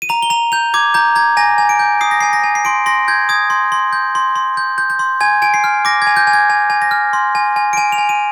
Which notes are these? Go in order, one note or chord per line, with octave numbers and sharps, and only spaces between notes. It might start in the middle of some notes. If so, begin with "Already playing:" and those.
D#7
A#5 F7
G7
A#5 F7
G6 F7
D6 G#6
A#5 G6
A#5 G#6
G#5 A#6
G#5
D7
G6
D#6 C7
A#6
G#5 C7
A#6
G#5
C7
C6 D7
C6 A#6
G6 G#6
D#6 G#6
C6
C6
G6
C6
C6
G6
G6
G6
C6
G#5 G#6
G#5 D7
C7
F6
D6 A#6
G#6
G#5
G6
G#5
G#6
G#5
G#5
A#6
F6
C6
G#5
G#5
D7
G#5 D#7
F7
G#5
D#7